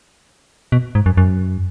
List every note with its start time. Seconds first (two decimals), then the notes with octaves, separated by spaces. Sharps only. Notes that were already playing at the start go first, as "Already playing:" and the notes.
0.72 B2
0.95 G#2
1.06 F#2
1.17 F#2